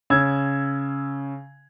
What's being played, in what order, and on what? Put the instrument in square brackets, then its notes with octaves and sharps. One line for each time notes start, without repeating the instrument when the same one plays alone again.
[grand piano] C#3 E6 G#6